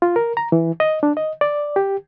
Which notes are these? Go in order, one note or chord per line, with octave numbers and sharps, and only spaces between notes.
F4
A#4
A#5
E3
D#5
D4
D#5
D5
G4